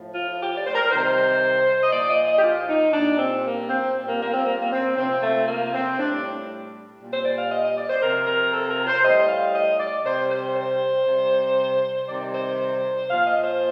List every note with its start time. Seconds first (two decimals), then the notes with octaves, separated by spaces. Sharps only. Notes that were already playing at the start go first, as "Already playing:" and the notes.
Already playing: A2 F3
0.15 F4
0.40 G4
0.58 D5
0.66 C5
0.74 A#4
0.91 C3 D#3 G3 C5
1.81 D#5
1.92 A#2 F3 D5
2.10 D#5
2.27 D#5
2.39 G4
2.43 F4
2.69 D#4
2.93 A#2 G3 D4
3.19 C4
3.45 A#3
3.70 C4
3.96 A#2 G3 C4
4.08 A#3
4.21 A#3
4.34 C4
4.46 A#3
4.61 A#3
4.72 C4
4.97 C3 F3 C4
5.23 A3
5.48 A#3
5.74 C4
5.98 A2 G3 D4
7.01 A#2 G3
7.13 C5
7.25 D5
7.38 F5
7.52 D#5
7.65 D#5
7.77 D5
7.90 C5
8.02 C3 F3 A#4
8.27 A#4
8.54 A4
8.70 A#4
8.87 C5
9.03 A2 G3 D#5
9.29 F5
9.54 D#5
9.80 D5
10.05 C3 G3 C5
10.30 C5
10.57 C5
11.07 C3 G3
12.09 C3 D#3 G3 D5
12.34 C5
13.10 A#2 F3 F5
13.27 D#5
13.44 C5